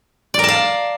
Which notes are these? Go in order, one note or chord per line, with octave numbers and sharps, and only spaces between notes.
A#4 D5 F5 A5